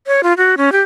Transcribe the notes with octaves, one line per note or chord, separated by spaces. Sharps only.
C#5
F4
F#4
C#4
G4